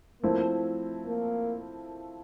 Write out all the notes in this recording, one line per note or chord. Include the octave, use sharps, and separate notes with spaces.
F3 A3 A#3 C4 E4
A#3